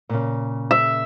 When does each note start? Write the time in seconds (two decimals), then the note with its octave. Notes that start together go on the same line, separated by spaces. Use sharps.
0.09 A#2 C#3
0.71 E5